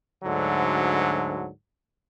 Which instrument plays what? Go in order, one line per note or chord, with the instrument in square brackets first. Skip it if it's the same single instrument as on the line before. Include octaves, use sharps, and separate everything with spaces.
[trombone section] D2 G#2 D3 F#3